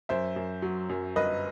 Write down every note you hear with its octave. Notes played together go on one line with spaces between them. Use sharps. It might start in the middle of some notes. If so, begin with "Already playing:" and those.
F#2 C5 E5
F#2
F#3
F#2
G1 B4 D#5